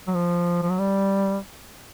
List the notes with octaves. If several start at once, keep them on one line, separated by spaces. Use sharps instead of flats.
F#3
F3
F3
F#3
G3